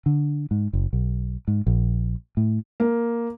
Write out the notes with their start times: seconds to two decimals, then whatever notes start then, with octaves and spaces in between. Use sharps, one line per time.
0.06 D3
0.51 G#2
0.73 F#1
0.93 B1
1.48 G#2
1.67 A#1
2.37 A2
2.80 A#3